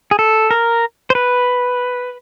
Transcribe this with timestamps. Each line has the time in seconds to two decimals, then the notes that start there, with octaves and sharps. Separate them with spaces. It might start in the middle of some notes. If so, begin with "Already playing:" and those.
0.11 G#4
0.19 A4
0.51 A#4
1.10 C5
1.15 B4